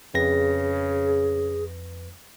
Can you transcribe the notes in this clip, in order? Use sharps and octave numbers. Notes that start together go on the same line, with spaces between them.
F2 C#3 G#4 B4 A#6